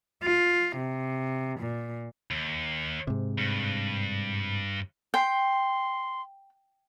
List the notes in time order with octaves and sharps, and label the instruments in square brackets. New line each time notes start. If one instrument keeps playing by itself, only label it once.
[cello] F4
C3
A#2
[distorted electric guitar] D#2
[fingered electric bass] G#2 C3
[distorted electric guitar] G2
[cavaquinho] G5 [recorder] C6